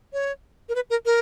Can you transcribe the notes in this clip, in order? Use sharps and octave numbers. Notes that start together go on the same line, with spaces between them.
C#5
A#4
B4
A#4
A#4